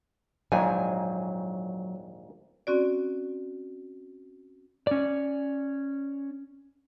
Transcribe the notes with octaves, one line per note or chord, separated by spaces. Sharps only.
A#1 D#2 G#2 F#3 G#5
C4 C#4 F#4 D5
C#4 D5